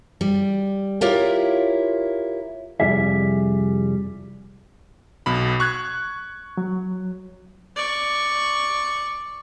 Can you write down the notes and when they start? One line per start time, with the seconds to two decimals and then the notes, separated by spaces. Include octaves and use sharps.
0.21 G3
1.01 E4 F4 G4 A#4 C#5
2.80 C2 F2 G3 G#4 E5
5.26 B1 B2 B5
5.60 C#6 F#6 G#6
6.57 F#3
7.76 D5 C#6